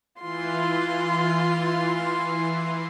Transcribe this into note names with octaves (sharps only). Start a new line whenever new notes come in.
E3 F4 C6